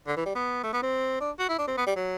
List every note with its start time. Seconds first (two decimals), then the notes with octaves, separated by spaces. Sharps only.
0.07 D3
0.17 E3
0.26 G3
0.35 B3
0.64 A3
0.73 B3
0.83 C4
1.21 D4
1.39 F#4
1.49 E4
1.59 D4
1.68 C4
1.78 B3
1.87 G3
1.96 F#3